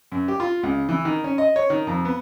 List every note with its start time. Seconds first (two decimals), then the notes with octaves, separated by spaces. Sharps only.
0.12 F#2
0.28 G4
0.40 F4
0.63 C#2
0.89 E3
1.05 D#3
1.24 C#4
1.38 D#5
1.56 C#5
1.70 D#3
1.87 F2
2.05 B3